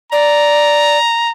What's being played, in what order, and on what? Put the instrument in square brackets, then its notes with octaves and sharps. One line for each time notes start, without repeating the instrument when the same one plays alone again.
[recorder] D5 [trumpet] A#5